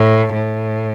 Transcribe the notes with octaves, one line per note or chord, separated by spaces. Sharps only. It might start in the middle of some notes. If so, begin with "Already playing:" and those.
Already playing: A2
A2